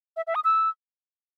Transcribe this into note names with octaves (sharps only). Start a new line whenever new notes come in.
E5
E5
D#6
E6